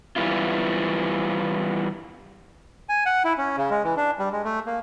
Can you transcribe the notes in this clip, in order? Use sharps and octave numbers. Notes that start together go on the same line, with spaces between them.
E3 G3 B3 E4 F4
G#5
F#5
E4
C#4
C#3
G#3
E3
D4
G3
G#3
A3
A#3